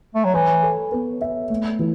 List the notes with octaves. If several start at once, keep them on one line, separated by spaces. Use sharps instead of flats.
A3
F#3
E3 C#5
A4
B3
E5
A3
E3